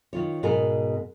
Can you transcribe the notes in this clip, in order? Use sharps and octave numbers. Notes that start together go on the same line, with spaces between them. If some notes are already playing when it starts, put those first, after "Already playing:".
D#3 F4 C#5
G#2 B2 G#4 A#4